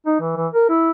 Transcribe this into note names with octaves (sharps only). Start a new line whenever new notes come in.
D#4
E3
E3
A#4
E4